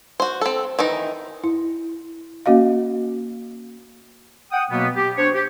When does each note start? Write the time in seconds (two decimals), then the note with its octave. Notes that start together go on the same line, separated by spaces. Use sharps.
0.20 F#4 C5
0.41 C4 A4
0.79 D#3 E3 D#4
1.44 E4
2.46 A#3 C#4 F#4 D#5 F5
4.52 F#5 G5 D#6
4.70 B2 F#3 A#3 B3
4.96 G4
5.17 D4 C5 C#5
5.35 G4